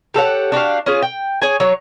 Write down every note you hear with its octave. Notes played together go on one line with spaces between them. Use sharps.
G4 A4 C#5 F#5
D4 F#4 G4 F5
C#4 F4 G#4
G5
G#4 C#5 G#5
F#3 C#5